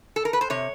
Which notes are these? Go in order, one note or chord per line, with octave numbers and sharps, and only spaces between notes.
A4
A#4
B4
C5
C3 C#5